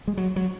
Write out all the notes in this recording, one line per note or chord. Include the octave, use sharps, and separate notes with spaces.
G#3
F#3
F#3